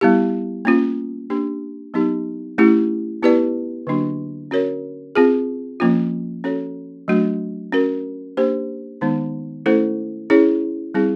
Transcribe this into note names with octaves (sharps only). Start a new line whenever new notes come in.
G3 B3 E4 G4
A#3 C#4 F4
A#3 D4 G4
F#3 B3 D#4 G4
A3 C#4 E4 G4
B3 E4 G4 B4 D5
D3 F#3 A#3 D4 F#4
C#4 F#4 A#4 C#5
C4 F4 G#4
F3 A#3 C#4 F4
C#4 F#4 A4 C#5
F#3 A3 D4 F#4
C#4 F#4 A#4
A#3 D4 G4 C5
D#3 G#3 B3 D#4
A3 C#4 E4 A4 C5
C#4 E4 G#4 C#5
G3 C4 E4 G#4